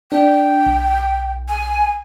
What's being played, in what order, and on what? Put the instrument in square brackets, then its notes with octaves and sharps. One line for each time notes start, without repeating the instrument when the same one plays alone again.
[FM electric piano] D4 [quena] G5
[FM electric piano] B1
[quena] G#5